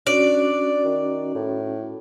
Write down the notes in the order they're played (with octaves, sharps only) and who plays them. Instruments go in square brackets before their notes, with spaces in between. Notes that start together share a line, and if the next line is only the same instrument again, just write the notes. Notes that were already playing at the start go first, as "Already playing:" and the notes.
[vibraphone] C#4 F#4 [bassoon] D4 [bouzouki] D5
[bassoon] D#3
A2